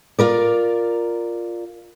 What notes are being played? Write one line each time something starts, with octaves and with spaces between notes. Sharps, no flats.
F4 A#4 D5